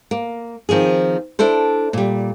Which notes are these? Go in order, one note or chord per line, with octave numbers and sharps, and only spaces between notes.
A#3
D#3 F3 C4 G#4
D4 E4 A4 C5
A#2 G3